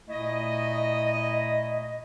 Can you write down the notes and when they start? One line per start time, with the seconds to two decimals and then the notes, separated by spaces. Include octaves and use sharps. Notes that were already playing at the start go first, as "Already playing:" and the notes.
0.08 A#2 A3 E4 D#5